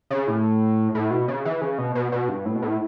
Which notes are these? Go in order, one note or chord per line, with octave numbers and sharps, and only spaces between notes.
C#3
A2
A2
B2
C#3
E3
C#3
B2
B2
B2
G2
A2
B2
A2